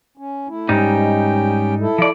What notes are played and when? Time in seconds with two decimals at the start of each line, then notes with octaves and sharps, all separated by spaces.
0.18 C#4
0.48 A3 E4
0.69 G#2 G3 C#4 D#4 G4 G5
1.80 E4 A4
1.98 F3 D5